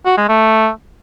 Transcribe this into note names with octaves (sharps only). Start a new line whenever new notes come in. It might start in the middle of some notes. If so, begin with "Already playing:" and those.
F#4
G#3
A3